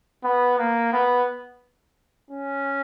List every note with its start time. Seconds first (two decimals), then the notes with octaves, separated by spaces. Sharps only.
0.24 B3
0.58 A#3
0.93 B3
2.30 C#4